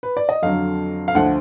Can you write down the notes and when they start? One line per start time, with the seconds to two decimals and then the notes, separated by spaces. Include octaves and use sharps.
0.03 B4
0.17 D5
0.29 D#5
0.42 F2 D3 F#3 F5
1.08 F5
1.15 D2 D3 F3 F#5